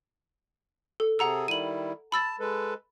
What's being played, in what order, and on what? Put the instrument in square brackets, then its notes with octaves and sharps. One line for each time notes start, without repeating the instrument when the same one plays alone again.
[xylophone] A4
[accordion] C3 G#4 A4 [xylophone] F#5 A#5 E6
[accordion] D#3 G3 E4 [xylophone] D#7 F#7
[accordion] A5 [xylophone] B5 E6 A6
[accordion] G#3 A4 B4